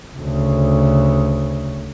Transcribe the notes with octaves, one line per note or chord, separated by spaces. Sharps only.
D2 C#3